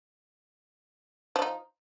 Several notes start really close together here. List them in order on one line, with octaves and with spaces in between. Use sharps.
F3 D4 D#4